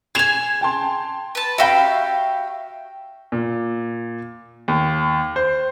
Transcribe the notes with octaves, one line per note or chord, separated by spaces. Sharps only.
G#4 G#5 G#6 E7 F7
G5 A5 C6
B4 A5
F#4 G4 E5 F5 G5 B5
A#2
D#2
C5